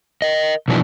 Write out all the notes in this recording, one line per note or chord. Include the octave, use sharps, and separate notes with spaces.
A#4 D#5
B2 E3 F3 D4